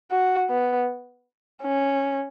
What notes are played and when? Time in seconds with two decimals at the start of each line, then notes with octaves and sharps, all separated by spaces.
0.11 F#4
0.50 B3
1.62 C#4